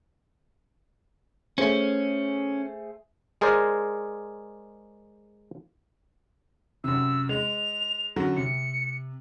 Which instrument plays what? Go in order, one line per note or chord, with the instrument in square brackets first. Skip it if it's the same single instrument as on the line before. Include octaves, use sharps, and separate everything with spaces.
[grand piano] A3 G#4 C5 [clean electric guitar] C#4
[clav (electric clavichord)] G#3 G#4 A#4 C5 D5
[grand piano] F#2 C3 [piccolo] E6
[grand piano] G#3 [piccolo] F7
[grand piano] F#2 D3 F#3
[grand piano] C3 [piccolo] C#7